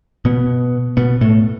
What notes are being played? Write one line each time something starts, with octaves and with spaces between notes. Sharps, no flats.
B2 B3
B2 B3
A2 A3